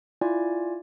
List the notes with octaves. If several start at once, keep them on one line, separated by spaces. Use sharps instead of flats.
E4 F4 D5 G#5